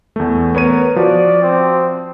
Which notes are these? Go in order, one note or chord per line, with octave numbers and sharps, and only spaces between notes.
E2 A3
B3 A#4 C#5 D#7
F3 F#4 D5
C4